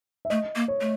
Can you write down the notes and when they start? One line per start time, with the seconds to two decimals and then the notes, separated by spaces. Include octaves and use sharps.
0.25 E5
0.30 A3 D#5
0.55 A#3
0.68 C#5
0.81 A3